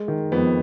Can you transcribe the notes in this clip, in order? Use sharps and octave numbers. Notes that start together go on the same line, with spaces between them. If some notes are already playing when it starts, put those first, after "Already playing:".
Already playing: G#3
D#3
F2 B3